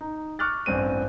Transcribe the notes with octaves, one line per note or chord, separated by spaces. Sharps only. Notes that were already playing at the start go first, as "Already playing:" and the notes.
D#4
C#6 D6 F6 F#6 A6
A1 G2 C4 D#7